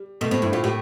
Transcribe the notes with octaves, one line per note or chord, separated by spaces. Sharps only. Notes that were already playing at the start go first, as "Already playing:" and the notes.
Already playing: G3
B2 A3
A2 C4
G2 E4
A2 F4
A2 G4